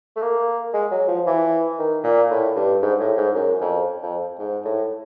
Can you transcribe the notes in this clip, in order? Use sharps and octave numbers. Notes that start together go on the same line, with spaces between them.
A3
A#3
G#3
F#3
F3
E3
D#3
A#2
A2
G2
G#2
A2
G#2
F#2
F2
F2
G#2
A2